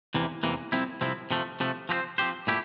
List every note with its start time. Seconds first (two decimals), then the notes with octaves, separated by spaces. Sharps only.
0.14 E2 C3 E3 A#3
0.43 E2 C3 E3 A#3
0.72 C2 C3 F3 C4 E4
1.01 C2 C3 F3 C4 E4
1.31 C3 F3 A3
1.60 C3 F3 A3
1.89 F3 C4 G4 C5
2.18 F3 C4 G4 C5
2.47 A#2 A3 E4 G4